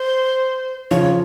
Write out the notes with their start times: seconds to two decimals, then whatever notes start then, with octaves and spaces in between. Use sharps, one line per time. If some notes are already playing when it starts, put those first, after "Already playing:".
Already playing: C5
0.91 C#3 F3 C#5